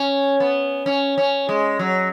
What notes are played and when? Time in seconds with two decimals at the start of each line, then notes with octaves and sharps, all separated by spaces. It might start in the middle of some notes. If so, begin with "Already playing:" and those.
Already playing: C#4
0.40 B3
0.86 C#4
1.18 C#4
1.49 G#3
1.79 F#3